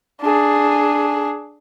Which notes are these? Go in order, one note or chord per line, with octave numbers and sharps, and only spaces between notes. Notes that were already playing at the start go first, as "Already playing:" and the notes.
D4 G#4